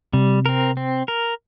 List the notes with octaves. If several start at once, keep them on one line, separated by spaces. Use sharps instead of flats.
C3 G3
C4 A#4
C4
A#4